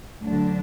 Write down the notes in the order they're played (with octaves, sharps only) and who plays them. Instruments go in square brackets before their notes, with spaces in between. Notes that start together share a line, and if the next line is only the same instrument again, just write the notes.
[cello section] D2 D3 F#3 D4